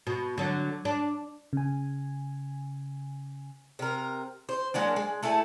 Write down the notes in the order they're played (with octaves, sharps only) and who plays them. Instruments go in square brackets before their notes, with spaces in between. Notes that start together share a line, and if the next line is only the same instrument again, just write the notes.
[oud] B2
D3 F#3
D4
[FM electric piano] C#3 G#5
[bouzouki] C3 A#4
C5
F#3 G#3 A#3 D4
G#3
A3 E4 A4 G#5